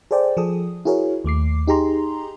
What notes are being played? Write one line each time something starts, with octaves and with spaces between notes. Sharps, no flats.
G#4 A4 C5 D5 G5
F3 G#4 A4 D#6
E4 F#4 G#4 A#4 C#5
D#2 A3 D6 C7
D#4 G4 G#4 A#5 C6